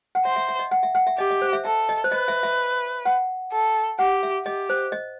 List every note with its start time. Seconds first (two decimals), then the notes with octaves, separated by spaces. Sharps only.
0.15 F#5
0.25 C5 E5
0.36 E5
0.49 E5
0.59 D#5
0.71 F#5
0.83 E5
0.95 F#5
1.07 E5
1.18 G4 D#5
1.31 D#5
1.42 C5
1.53 E5
1.65 A4 E5
1.89 D#5
2.04 C5
2.12 B4 D#5
2.28 E5
2.43 E5
3.05 F#5
3.52 A4
3.99 G4 F#5
4.23 E5
4.46 G4 D#5
4.70 C5
4.92 D#5